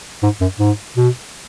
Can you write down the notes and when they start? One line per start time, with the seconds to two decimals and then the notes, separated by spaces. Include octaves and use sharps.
0.23 G#2
0.41 F#2
0.60 G#2
0.97 B2